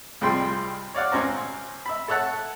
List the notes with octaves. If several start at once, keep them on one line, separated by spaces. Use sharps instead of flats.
C2 F3 G3 G#3 G5 C6
C#5 D5 F5 F#5
C#2 C4 C#4 C5 A#5
E5 B5
A4 C#5 E5 F#5 A5